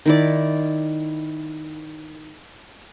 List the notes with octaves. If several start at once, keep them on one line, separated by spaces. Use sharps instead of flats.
D#3 E4 D5